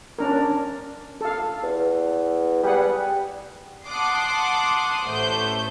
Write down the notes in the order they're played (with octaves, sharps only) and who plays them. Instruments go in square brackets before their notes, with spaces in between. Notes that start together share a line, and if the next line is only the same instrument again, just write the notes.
[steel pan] C#4 D4 A#4
A4 F5
[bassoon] E2
[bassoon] G3 [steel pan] G#4 B4 F#5
[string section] F#5 A5 C6 D6 D#6 C7
A1 A3 C5 G6